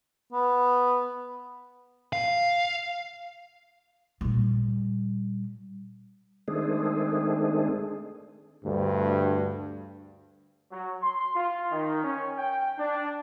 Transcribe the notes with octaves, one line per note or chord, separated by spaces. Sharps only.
B3
F5
A#2 G3
D#3 G#3 A3 C4 D4 G#4
D2 G2
F#3
C6
F4
D#3
C#4
G5
D4